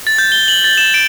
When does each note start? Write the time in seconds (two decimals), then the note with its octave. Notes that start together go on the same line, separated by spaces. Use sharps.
0.07 A6
0.18 G6
0.32 G7
0.48 F#7
0.64 A6
0.78 E7
0.94 D7